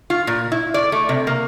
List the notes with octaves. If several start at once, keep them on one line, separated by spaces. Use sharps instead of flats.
F4
A#2
E4
D5
A3
C3
A#3